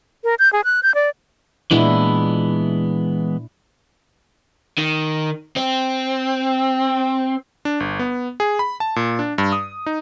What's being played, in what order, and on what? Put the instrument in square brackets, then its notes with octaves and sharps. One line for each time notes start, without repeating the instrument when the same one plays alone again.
[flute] A#4
G6
G#4
F#6
G6
D5
[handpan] A#2 D4 E4 [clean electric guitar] E3 G#3 B3
[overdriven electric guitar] D#3
C4
[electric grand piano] D4
G1
B3
G#4
B5
A5
A#2
D4
G2
D#6
D#4